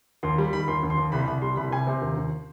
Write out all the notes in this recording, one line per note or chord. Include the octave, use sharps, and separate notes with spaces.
D#2 C6
G3 B5
D#3 B5
D#2 C6
D#2
C6
D#2
C2 B5
C2 B5
G3 C6
C2 B5
C3 G#5
C3 C5
D#2
D#2